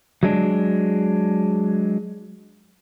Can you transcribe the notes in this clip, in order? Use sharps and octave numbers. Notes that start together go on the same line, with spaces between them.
F#3 G#3 D4